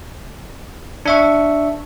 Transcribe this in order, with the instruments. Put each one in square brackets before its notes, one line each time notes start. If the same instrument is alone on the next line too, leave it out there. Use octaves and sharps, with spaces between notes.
[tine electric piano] D4 E5 C#6